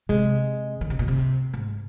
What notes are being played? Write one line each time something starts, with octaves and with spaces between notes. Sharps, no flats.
C3 G#3
D#3
C3
A#2
C3
G#2